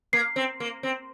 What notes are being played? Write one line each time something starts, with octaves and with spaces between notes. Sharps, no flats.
A#3 C7
C4
A#3
C4